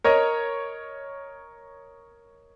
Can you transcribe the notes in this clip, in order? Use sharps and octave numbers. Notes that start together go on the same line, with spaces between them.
A#4 C#5 D#5